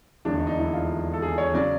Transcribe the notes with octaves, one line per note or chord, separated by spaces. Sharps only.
E1 D#2 D3 F#3 D4
D#4
D#4
E4
F4
A4
G#4
C#5
C#3 F#3 D5